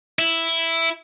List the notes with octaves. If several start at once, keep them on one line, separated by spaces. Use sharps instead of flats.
E4